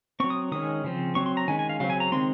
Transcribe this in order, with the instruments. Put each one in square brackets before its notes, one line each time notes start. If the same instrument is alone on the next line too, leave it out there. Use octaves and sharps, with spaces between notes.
[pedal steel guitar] F#3 C4 C#6
D#6
D#3 G#3 C#4 D#6
C#3 F3 C4
F#3 C4 C#6
C6
A#5
D#3 G#3 C#4 G#5
G#5
F5
C#3 F#3 C4 F5
G#5
A#5
D#3 G#3 C4 C6